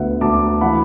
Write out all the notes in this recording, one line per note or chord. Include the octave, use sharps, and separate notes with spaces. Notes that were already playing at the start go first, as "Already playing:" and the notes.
Already playing: D2 B3 E5 F#5
D2 A5 D6
E3 F#5 B5